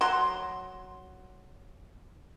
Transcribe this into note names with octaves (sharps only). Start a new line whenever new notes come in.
F#3 C6